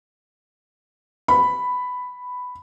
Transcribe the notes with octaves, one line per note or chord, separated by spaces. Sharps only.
B5